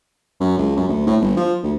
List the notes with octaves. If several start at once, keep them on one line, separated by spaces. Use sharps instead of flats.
F#2
C#2
F#2
D2
A2
G1
F3
D2